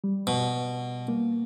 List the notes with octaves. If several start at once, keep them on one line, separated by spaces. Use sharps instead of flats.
G3
B2
A#3